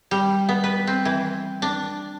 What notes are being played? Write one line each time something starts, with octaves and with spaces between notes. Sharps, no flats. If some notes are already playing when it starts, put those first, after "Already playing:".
G3
B3
B4
C4
E3
D4